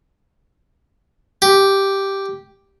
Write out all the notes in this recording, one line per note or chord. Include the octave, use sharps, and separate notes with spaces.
G4